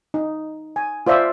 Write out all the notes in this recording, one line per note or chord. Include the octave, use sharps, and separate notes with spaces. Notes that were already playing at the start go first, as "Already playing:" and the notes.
D#4
G#5
F4 C5 D5 E5